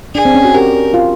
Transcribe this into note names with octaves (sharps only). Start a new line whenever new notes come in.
D4 G#4
C4
C#4
F#4
G4 A#4
F4